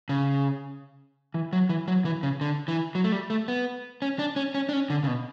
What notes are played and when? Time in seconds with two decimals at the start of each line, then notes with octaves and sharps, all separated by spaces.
0.09 C#3
1.34 E3
1.53 F#3
1.69 E3
1.88 F#3
2.05 E3
2.23 C#3
2.41 D3
2.68 E3
2.95 F#3
3.04 A3
3.12 G3
3.30 A3
3.48 B3
4.02 C#4
4.19 D4
4.36 C#4
4.54 C#4
4.69 D4
4.73 C#4
4.90 D3
5.04 C#3
5.07 B2